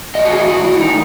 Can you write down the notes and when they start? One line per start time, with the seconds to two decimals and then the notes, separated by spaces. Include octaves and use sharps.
0.15 A2 E3 D#5
0.25 F#4
0.31 G#4
0.48 F#4
0.64 E4
0.81 D#4